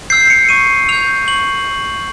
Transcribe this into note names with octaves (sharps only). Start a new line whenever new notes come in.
E6 G6 C7
C#7
C#6 D#7
E6 G6 F7
C#6 F#7